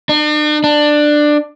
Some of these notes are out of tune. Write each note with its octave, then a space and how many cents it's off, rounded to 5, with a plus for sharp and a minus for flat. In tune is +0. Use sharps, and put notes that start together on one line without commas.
D4 +45
D4 +15